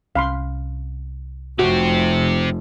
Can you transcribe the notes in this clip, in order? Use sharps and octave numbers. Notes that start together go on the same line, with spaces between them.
C2 C#4 F5 B5 C6
F1 C4 F#4 G4